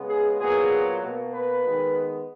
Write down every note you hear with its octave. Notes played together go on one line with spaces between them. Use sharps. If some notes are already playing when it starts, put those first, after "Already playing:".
Already playing: C#3 G#3 B3
G#4
A#2 F#3 B3 G#4
B2 A#3
B4
D#3 G#3 B3